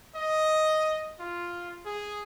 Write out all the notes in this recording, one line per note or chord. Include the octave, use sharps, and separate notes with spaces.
D#5
F4
G#4